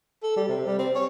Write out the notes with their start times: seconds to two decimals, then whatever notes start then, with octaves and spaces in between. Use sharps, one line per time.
0.23 A4
0.37 G3
0.49 C3
0.67 G3
0.79 C4
0.95 C#5